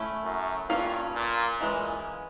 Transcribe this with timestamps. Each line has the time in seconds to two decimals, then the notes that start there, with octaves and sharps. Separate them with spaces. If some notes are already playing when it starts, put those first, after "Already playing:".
Already playing: A3 C#4 E4
0.24 F#2
0.70 G2 A#3 C#4 F4
1.15 A#2
1.60 A#2 E3 G#3 C#4